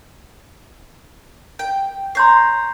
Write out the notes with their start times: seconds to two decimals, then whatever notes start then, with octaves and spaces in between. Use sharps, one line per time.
1.59 G5
2.15 C#5 A#5 C6 G6 C7